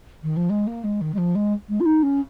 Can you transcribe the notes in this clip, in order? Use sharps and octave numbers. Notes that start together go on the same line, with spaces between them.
D#3
F3
G#3
A#3
G#3
D#3
G#3
F3
G#3
G#3
F4
D#4
C#4